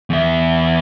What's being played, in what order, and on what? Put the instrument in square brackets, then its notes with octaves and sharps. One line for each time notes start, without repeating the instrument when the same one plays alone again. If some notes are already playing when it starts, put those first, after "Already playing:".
[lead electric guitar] E2 E5